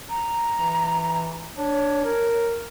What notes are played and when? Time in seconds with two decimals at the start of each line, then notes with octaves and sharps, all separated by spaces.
0.10 A#5
0.55 E3
1.57 D4 C#5
2.04 A#4